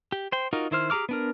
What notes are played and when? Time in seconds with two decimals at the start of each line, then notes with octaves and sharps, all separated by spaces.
0.12 G4
0.32 C5 G5
0.53 D#4 F4 F#4 A#4
0.71 D#3 E4 C5 F6
0.90 G4 G#4 A#5 D6 F6
1.09 B3 D4 A#4